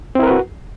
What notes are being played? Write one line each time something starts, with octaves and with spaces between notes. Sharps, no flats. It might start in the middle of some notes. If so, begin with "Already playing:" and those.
C4 E4 F#4 A#4 B4